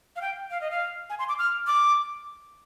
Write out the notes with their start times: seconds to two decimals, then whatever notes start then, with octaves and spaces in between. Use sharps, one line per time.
0.16 F5
0.21 G5
0.51 F5
0.61 D#5
0.71 F5
1.10 G#5
1.19 C6
1.29 D6
1.39 F6
1.67 D6